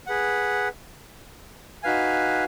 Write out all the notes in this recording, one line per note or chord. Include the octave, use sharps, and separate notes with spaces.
G#4 B4 F#5
D#4 F#4 B4 F5 G#5